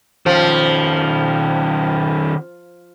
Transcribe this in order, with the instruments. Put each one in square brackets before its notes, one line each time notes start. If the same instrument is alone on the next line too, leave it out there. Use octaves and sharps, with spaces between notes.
[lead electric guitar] D#3 C#4 [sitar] F3